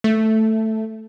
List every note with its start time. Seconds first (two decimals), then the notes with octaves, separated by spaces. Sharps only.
0.04 A3